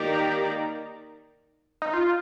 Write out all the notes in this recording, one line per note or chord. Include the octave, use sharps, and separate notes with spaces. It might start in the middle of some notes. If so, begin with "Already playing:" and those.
Already playing: D#3 A#3 D#4 G4 A#4 D5
D#4
F4